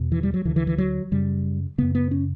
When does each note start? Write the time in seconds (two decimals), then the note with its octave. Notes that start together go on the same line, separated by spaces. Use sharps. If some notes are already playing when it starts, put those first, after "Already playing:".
Already playing: E2 B2
0.12 E3
0.23 G3
0.34 F#3
0.45 D2 D3 E3
0.56 E3
0.67 E3
0.78 F#3
1.11 F#2 C#3 G3
1.78 F#2 C#3 B3
1.95 B3
2.11 C#4